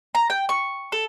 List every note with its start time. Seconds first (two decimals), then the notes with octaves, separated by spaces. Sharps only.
0.15 A#5
0.30 G5
0.49 C#6
0.92 A4